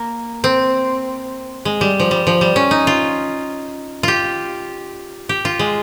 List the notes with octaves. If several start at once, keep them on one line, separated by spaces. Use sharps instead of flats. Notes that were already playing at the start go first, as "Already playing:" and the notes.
Already playing: A#3
C4
G#3
G3
F3
G3
F3
G3
C#4
D#4
F4
F4 G4
G4
F4
G#3